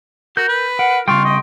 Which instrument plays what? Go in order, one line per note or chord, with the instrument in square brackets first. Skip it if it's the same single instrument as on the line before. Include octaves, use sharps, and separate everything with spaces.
[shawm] F#4 [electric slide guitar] A#4 [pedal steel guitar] G6
[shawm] B4
[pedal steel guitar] A#4 [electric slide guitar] F#5
[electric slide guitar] C#3 G3 [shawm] F4 [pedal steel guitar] G5 C6 C#6
[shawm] D#5